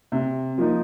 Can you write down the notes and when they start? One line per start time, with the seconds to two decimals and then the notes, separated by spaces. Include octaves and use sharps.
0.12 C3
0.58 F3 A#3 D#4